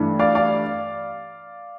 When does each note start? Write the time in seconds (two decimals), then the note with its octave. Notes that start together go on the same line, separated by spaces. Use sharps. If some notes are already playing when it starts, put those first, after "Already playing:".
Already playing: G2 E3 A3 D4
0.19 D5 F5
0.35 D5 F5